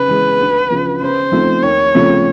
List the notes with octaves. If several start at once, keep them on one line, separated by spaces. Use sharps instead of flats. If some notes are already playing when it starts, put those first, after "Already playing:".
Already playing: C#3 B4
E3 G#3
D2
C#3 F3
C#3 C5
F3 A3 C4 D#4
D#2 C#5
C#3 F3 A3 C4